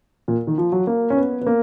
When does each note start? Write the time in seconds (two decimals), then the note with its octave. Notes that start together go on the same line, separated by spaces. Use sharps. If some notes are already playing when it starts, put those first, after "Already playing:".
0.28 A#2
0.47 D#3
0.58 F3
0.72 F#3
0.87 A#3
1.10 C#4
1.17 B3
1.41 B3
1.46 A#3